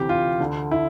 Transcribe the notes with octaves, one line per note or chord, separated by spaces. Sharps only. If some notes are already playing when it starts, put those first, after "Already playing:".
Already playing: D2 C3 E3 G4
F4
D2 D3
E4